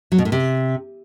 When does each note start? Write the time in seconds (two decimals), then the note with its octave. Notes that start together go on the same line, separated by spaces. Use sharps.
0.12 F#3
0.18 B2
0.25 A2
0.32 C3